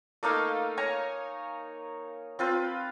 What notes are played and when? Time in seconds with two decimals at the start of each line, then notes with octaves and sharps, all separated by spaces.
0.23 A3 A#3 D#4 F5
0.77 C#5 G#5 A#5 C#6
2.39 C4 F4 B4